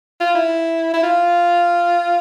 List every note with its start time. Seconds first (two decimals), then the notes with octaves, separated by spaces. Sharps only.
0.20 F4
0.35 E4
0.94 E4
1.03 F4